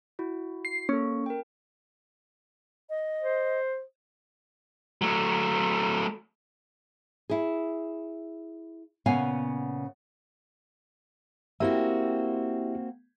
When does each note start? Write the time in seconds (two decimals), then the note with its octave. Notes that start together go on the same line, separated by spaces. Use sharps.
0.19 E4 F#4
0.65 C7
0.89 A#3 C#4 A4
1.26 A#4 G5
2.90 D#5
3.22 C5
5.02 F#3 A3
7.30 E4 G#4
9.06 A#2 C#3 B3 C#5 F5 G#5
11.60 A#3 C4 E4 F#4 G4 E5